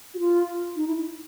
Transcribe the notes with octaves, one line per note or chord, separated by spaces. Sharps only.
F#4
F4
D#4
E4